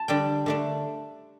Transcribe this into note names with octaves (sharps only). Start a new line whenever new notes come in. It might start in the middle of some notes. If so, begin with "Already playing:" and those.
Already playing: A5
D3 G3 D4 G5
D3 A3 D4